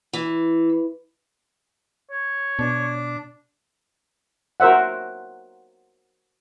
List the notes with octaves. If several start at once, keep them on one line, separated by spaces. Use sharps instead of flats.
E3
C#5
B2 D4
F#4 A#4 C5 E5 F#5